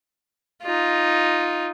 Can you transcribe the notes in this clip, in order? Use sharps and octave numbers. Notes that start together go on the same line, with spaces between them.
D#4 F4